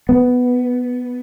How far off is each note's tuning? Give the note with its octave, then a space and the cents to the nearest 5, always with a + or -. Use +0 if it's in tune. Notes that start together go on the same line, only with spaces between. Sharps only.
B3 +5